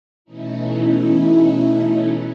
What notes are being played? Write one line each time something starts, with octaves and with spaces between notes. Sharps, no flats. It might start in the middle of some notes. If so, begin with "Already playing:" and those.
B2 E3 A3 C#4 D#4 E4